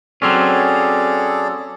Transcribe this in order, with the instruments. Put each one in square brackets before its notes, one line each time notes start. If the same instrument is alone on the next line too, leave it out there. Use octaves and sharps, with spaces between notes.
[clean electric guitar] F#3 C4 C#4 [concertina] G#4 A4 D5